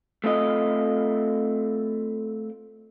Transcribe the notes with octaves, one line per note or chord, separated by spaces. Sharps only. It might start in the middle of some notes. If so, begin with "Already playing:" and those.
A3 C4 F4 D#5